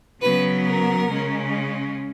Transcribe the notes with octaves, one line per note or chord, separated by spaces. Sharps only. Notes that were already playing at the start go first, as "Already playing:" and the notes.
C#3 F#3 B3 B4
A#4
C#3 G#3 C#4